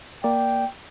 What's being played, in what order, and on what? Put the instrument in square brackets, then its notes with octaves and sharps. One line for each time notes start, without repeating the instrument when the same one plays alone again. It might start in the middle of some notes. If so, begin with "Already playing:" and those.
[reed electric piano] A#3 D5 [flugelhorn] G5